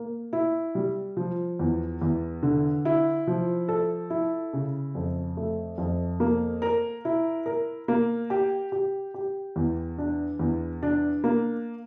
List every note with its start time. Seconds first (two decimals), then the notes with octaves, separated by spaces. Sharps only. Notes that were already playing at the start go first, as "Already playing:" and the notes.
Already playing: A#3
0.33 E4
0.75 G3
1.17 F3
1.59 E2
2.02 E2
2.43 D3
2.85 E4
3.27 F3
3.68 A4
4.10 E4
4.53 C#3
4.95 F2
5.37 A3
5.78 F2
6.20 A#3
6.62 A#4
7.05 E4
7.46 A#4
7.88 A#3
8.30 G4
8.72 G4
9.14 G4
9.56 E2
9.98 D4
10.39 E2
10.83 D4
11.24 A#3